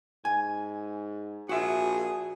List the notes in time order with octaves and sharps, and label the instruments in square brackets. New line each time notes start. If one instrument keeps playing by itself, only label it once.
[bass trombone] G#2 [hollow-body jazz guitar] G#5
[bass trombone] A#1 [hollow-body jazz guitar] F#4 E5 [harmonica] G#4